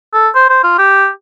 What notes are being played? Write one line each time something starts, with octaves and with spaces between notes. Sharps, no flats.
A4
C5
C5
F4
G4